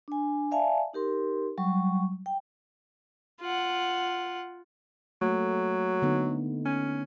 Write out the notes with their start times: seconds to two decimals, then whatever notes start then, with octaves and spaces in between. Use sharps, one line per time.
0.08 D4 G#5
0.51 D5 E5 F5 G#5 A5
0.93 D#4 G4 A#4 C6
1.58 F#3 G3 C#6
2.26 G5
3.41 F4 F#5
5.22 F#3 A3 A#3
6.02 D3 B3 D#4
6.65 C#4